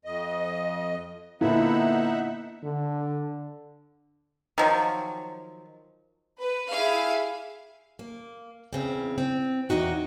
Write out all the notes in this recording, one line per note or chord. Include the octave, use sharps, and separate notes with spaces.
F2 D#5
A#2 D3 B3 D#4 E4 E5 F#5
D3
D#3 F3 F#3
B4
E4 G4 G#4 E5 F5
A#3
E2 C#3 C4
C4
E2 G2 D#4 F#4 G5